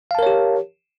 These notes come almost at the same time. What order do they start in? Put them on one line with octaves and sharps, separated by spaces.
F5 A5 A#4 C#5 G4